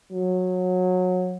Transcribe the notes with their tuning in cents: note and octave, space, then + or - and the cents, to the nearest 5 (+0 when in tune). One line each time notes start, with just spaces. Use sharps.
F#3 -20